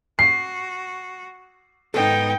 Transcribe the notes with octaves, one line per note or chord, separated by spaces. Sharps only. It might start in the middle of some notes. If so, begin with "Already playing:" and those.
F#4 C7
G#2 B3 D#4 A4 G5